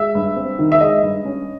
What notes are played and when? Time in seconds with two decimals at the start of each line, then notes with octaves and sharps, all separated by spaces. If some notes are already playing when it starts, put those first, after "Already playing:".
Already playing: G#3 E5
0.15 G2
0.36 C4
0.59 D#3
0.72 E5
0.81 G#3 D#5
1.03 G2
1.25 C#4